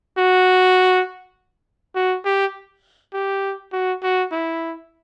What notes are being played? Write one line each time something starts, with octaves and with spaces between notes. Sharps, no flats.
F#4
F#4
G4
G4
F#4
F#4
E4